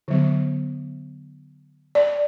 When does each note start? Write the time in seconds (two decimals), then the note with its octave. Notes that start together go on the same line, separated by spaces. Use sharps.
0.08 D3 F#3 B3
1.95 D5